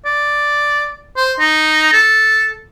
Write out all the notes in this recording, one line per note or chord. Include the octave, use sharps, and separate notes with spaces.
D5
C5
D#4
A4